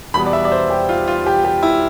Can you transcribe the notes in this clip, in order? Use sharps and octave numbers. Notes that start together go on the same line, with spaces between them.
E2 B2 G3 B3 B5
D5
E5
D5
C5
G4
F4
F4
G4
G4
E4